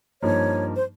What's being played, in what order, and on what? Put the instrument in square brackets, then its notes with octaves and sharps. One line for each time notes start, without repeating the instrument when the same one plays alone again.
[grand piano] G2 F3 A#3 D#4 [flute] C#5
[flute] C5